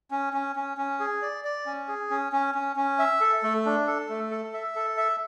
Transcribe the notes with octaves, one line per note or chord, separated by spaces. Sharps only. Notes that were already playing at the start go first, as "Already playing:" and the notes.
C#4
C#4
C#4
C#4
G#4
D5
D5
C#4
G#4
C#4
C#4
C#4
C#4
E5
A4
A3
D4
A4
A3
A4
E5
A4
E5